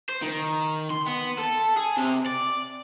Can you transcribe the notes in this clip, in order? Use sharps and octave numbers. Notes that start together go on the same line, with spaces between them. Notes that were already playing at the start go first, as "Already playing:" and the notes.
C5
D#3
C6
B3
A4
G#4
C3
D5